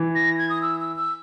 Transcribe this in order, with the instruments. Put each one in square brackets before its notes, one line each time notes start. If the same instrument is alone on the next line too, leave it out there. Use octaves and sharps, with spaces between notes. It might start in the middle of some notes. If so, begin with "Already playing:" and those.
Already playing: [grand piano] E3
[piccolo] A#6
G#6
D#6
E6
E6
E6